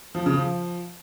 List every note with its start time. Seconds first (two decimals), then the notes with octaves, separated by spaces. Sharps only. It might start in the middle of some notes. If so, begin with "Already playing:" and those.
0.15 F3
0.26 C#3
0.37 F3